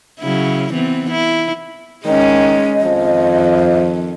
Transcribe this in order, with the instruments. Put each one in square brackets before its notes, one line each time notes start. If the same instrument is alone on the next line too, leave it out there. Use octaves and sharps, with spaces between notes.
[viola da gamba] C#3 F#3 E4
E3 B3 C4
E4
[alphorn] D#3 [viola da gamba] G#3 C#4 [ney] D#5
[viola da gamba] F2 D#3 [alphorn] F3